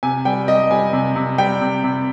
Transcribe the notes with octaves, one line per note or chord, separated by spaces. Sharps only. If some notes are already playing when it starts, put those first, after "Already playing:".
C3 G#5
G3 G5
G3 D#5
G3 G#5
C3
C3
G3 G5
C3
C3